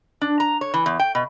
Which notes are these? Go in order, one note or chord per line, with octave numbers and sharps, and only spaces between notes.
D4
A#5
C#5
E3
E2
G5
B2